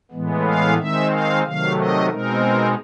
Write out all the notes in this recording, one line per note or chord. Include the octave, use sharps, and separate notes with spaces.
A2 E3 G#3 B3
F5
D#3 G#3 C4 D#4 E5
F5
C3 D#3 F#3 A3 F5
D#5
B2 G#3 C4 D#4 A#4